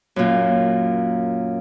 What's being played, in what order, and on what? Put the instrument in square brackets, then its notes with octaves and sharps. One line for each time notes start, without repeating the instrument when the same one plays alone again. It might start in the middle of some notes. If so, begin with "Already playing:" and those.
[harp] F#2 A#2